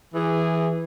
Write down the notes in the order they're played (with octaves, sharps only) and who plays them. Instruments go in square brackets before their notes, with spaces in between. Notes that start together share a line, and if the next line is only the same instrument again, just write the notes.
[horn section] E3 G#4